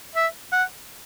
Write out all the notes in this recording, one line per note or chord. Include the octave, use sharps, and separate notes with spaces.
E5
F#5